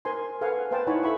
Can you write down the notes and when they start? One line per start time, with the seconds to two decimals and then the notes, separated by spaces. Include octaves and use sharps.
0.05 A#4 C5 G#5 C6
0.41 A4 B4 F5 F#5 G#5
0.71 B4 C5 F5 G5 A5
0.87 D#4 E4 C#5 F#5 G#5 B5
1.03 A4 E5 B5 C#6